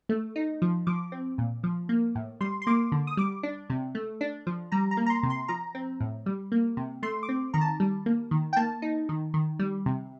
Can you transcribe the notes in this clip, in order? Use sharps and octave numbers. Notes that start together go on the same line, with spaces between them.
A3
D#4
F3
F3 D6
C4
A#2
F3
A#3
A2
G3 C6
C6
A#3 D6
D3
D#6
G3 D6
D4
C3
A3
D4
F3
G3 A#5
A#5
A#3
A#5
C6
C3
C6
F3 A#5
C4
A2
G3
A#3
C3
A3 C6
D6
C4
D#3 A#5
A5
G3
A#3
D#3
G5
A#3 A5
D#4
D#3
D#3
G3
C3